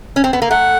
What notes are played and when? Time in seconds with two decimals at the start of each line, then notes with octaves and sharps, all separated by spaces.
0.16 C#4
0.24 C4
0.33 B3
0.42 A#3
0.50 A3 F#5